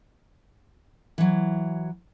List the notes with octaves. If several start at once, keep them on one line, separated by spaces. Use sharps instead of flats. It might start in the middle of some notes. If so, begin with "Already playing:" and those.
E3 F#3